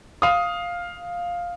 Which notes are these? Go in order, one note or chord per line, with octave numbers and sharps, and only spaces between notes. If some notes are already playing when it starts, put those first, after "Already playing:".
F5 D#6